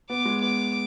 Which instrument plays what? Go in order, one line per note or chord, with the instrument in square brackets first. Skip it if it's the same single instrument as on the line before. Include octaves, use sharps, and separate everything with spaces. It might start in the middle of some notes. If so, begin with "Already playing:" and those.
[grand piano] B3 [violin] D6
[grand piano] G#3
[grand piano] B3 [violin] D6